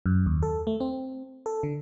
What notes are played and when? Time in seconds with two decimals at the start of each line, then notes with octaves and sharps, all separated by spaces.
0.06 F#2
0.26 D#2
0.43 A4
0.67 A3
0.80 C4
1.46 A4
1.63 D3